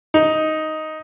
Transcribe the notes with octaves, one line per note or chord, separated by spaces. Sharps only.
D#4